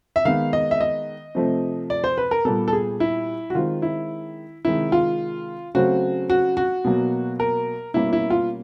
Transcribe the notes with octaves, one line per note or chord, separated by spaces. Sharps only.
E5
D#3 G#3 B3 F5
D#5
E5
D#5
C3 F3 A3 C4
D5
C5
B4
A#4
A#2 G3 B3 A4
A4
G#4
E4
F#4
D#3 G#3 C4 F4
E4
C3 D#3 G#3 E4
F4
C#3 F#3 A3 C4 F#4
F#4
F#4
B2 F#3 A#3
A#4
B2 G3 A#3 C#4 E4
E4
F4